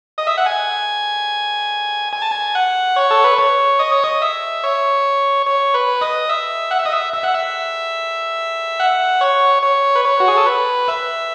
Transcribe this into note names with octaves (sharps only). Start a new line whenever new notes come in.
D#5
E5
F#5
G#5
G#5
A5
G#5
F#5
C#5
A4
B4
C#5
D#5
C#5
D#5
E5
C#5
C#5
B4
D#5
E5
F#5
E5
D#5
E5
E5
F#5
E5
F#5
C#5
C#5
B4
C#5
F#4
G#4
A4
B4
E5